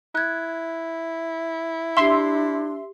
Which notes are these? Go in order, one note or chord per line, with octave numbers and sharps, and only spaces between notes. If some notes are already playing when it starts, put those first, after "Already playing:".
E4 F#6 G#6
D4 G4 E5 C6 C7 G7